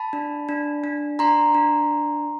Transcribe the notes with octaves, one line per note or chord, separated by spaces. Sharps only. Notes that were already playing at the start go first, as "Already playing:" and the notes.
Already playing: A5 B5
D4
D4
D4
D4 A#5 C6
D4